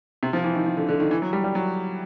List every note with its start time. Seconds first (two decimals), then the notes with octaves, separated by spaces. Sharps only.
0.23 C3
0.33 F3
0.44 E3
0.55 D#3
0.66 D#3
0.77 D3
0.89 D3
1.00 D#3
1.11 E3
1.22 F#3
1.33 G3
1.44 G3
1.55 F#3